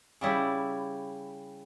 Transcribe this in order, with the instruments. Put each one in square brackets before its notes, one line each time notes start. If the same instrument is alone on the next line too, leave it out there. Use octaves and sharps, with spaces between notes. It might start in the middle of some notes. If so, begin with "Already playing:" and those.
[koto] C#3 G3 E4